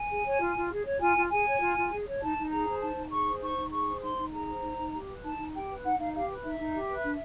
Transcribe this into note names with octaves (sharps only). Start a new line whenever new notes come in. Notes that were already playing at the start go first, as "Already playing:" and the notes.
Already playing: G#5
G#4
C#5
F4
F4
G#4
C#5
F4 G#5
F4
G#4 G#5
C#5
F4
F4
G#4
C#5
D#4 A5
D#4
G#4 A#5
C5
D#4 A5
D#4
G#4 C#6
C5
D#4 C#6
D#4
G#4 C#6
C5
D#4 C6
D#4
G#4 A#5
C5
D#4
D#4
G4
B4
D#4 A5
D#4
G4 G5
B4
D#4 F#5
D#4 F5
G4 F5
B4
D#4 E5
D#4
G4
B4
D4